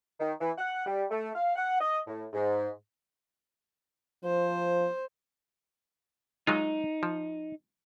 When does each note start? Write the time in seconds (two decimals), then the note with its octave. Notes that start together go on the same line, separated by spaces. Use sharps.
0.20 D#3
0.41 E3
0.58 F#5
0.86 G3
1.11 A3
1.35 F5
1.56 F#5
1.81 D#5
2.07 A2
2.33 G#2
4.24 F3 C5
6.47 F#3 G#3 D#4 F4
7.03 F3